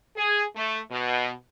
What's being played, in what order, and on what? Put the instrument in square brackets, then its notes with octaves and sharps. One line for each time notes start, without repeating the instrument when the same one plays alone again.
[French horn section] G#4
A3
B2